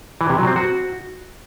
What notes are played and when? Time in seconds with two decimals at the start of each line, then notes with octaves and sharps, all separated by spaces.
0.21 E3
0.29 C3
0.38 F#3
0.47 C4
0.56 F#4